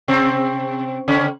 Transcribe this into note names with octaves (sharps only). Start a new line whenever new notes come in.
C3 C4
C#3 C#4